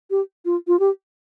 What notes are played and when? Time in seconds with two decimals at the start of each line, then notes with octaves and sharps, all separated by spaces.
0.11 G4
0.45 F4
0.67 F4
0.79 G4